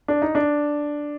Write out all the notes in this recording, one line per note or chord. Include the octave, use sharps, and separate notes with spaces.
D4
D#4
D4